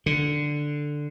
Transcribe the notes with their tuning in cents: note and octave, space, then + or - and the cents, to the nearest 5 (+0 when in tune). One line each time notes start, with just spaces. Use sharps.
D3 +5